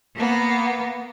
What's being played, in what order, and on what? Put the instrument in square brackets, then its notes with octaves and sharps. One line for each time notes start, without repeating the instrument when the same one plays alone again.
[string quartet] A#3 B3